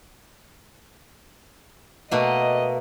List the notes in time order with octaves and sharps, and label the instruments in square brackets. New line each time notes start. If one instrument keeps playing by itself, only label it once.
[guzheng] B2 A3 A#3 [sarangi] D#5